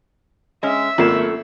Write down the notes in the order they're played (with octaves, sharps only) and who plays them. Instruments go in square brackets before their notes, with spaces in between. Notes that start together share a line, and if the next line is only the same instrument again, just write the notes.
[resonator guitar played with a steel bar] G#3 C#4 [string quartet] E5
[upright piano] G#1 A#3 [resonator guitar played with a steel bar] F#2 A3 [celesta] F4 C7 E7